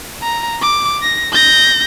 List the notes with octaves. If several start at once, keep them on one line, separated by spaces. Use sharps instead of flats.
A#5
D6
A#6
G6 A#6